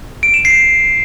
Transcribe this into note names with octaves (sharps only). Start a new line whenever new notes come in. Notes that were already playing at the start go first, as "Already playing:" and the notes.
D7
E7
C7